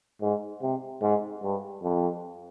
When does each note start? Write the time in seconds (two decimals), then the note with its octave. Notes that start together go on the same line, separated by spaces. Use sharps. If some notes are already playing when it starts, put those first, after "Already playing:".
0.21 G#2
0.62 C3
1.02 G#2
1.43 G2
1.83 F2